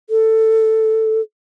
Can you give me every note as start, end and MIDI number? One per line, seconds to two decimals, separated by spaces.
0.10 1.21 69